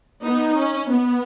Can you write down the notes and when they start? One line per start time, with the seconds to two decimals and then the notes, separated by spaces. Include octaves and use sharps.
0.23 B3 D#4
0.57 C#4
0.90 B3